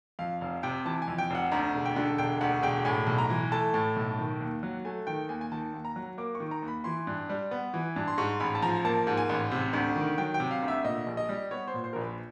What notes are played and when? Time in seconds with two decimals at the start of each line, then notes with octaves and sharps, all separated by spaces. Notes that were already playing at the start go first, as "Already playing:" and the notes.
0.19 F2 F5
0.41 F1 F5
0.63 C3 G5
0.85 E3 A5
1.02 G#5
1.07 F2
1.18 G5
1.30 F1 F#5
1.52 D2 A#5
1.75 E1
1.85 G5
1.96 D3
2.18 E1 G5
2.41 D2 F#5
2.62 E1 G5
2.85 A2 G#5
3.07 B1
3.18 A#5
3.30 E3
3.52 A3 A5
3.74 A2
3.96 B1
4.19 D#3
4.40 D#2
4.63 F#3
4.85 A3 G#5
5.07 D#3 G5
5.29 D#2 G#5
5.41 G#5
5.52 D#3 A5
5.74 D#2
5.85 A#5
5.96 F#3
6.18 A#3 D6
6.35 C#6
6.40 D#3
6.51 A#5
6.62 D#2
6.68 B5
6.84 E3 C6
7.07 G2
7.30 G3
7.51 B3
7.74 E3
7.96 G2
8.08 C6
8.18 G#2 C#6
8.40 A1 B5
8.55 A5
8.62 F3 A#5
8.85 A#3 A5
9.07 G#2
9.17 G#5
9.29 A1
9.51 C3
9.73 D2
9.96 D#3
10.18 F#3 G5
10.34 G5
10.40 C3
10.51 F5
10.62 D2
10.68 E5
10.84 A#2 D#5
11.06 A#1
11.17 D#5
11.29 G3
11.51 B3 C#5
11.68 C5
11.74 A#2
11.84 C5
11.93 A#1 A#4
12.01 B4